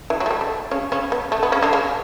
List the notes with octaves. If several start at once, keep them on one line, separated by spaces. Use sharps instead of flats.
E3
F#3
A3
G3
A3
C#3 C#4
C#3 C#4
B3
A3
B3
C#3 C#4
D3
C#3